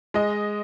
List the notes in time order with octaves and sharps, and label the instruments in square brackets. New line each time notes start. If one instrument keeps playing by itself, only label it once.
[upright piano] G#3 D#5